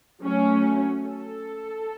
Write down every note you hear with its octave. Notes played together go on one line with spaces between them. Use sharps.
F#3 A3 C#4
A4